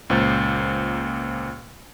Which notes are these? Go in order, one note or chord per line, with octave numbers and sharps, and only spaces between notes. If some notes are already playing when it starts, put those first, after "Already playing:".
C#2 A#2 C5 F6 F#6 A6